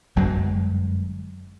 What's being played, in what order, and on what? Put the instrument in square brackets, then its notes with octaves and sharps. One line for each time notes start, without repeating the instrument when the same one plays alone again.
[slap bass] G1 F#2 F#3 G#3